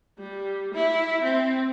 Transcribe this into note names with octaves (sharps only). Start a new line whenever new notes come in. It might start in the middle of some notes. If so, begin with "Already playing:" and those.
G3
E4
C4